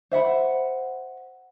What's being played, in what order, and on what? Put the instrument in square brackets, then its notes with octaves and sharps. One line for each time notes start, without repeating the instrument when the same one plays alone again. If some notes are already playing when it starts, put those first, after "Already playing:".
[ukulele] C5 E5 F#5 B5